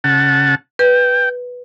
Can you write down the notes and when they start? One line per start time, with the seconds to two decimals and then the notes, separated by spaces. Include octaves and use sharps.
0.04 C#3 F#5 A5
0.79 B4 G5